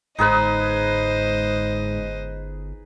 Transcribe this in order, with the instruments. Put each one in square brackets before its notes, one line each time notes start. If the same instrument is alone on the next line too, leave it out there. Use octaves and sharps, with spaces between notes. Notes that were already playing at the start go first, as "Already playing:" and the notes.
[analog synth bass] G1 [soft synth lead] G#2 [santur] D#4 G#4 B4 [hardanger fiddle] C5 D#5